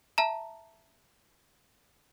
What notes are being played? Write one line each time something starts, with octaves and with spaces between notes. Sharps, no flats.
E5 A5 A#5